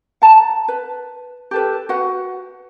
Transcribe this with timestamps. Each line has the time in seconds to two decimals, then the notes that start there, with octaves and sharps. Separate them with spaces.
0.22 F#5 A5 A#5
0.68 B4
1.51 G4 A4 B4
1.89 F#4 B4 F#5